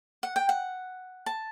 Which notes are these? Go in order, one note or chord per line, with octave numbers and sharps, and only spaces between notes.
F#5
G5
F#5
A5